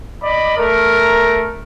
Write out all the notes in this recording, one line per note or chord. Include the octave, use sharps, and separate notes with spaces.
D5 D#5 B5
A3 A#4